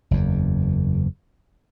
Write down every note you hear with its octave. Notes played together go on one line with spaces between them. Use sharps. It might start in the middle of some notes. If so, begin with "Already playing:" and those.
F#1 E2